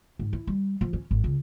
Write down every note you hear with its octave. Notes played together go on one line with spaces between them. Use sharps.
G#2
E4
G3
F3
C#4
G#1
C#2